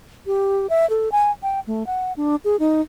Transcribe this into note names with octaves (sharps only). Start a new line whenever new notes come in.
G4
E5
A4
G#5
G5
A3
F#5
D4
G#4
D#4